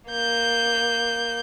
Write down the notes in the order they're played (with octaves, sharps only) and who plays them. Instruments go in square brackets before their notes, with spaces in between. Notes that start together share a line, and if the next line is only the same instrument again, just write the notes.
[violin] A#3 G6